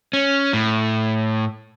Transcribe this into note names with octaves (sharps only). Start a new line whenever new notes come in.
C#4
A2